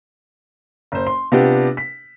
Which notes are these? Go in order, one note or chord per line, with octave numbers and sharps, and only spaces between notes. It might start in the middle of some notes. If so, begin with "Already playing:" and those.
F#1 C5
C6
C3 B3 D4 F4 G4
B6